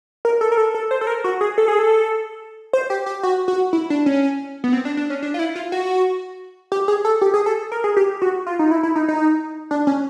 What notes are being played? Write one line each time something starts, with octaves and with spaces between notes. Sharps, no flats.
A#4
A4
A#4
A4
A4
C5
A4
A#4
F#4
G#4
A4
G#4
A4
C5
G4
G4
F#4
F#4
E4
D4
C#4
B3
C4
D4
D4
C#4
D4
F4
E4
F4
F#4
G4
G#4
A4
G4
G#4
A4
A#4
G#4
G4
F#4
F4
D#4
E4
E4
D#4
D#4
D4
C#4